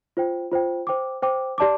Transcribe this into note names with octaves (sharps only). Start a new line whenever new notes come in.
F4 C5 G5
F4 C5 G5
C5 G5 D6
C5 G5 D6
G4 D5 A5 D6